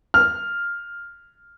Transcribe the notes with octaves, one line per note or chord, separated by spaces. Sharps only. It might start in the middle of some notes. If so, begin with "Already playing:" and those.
F6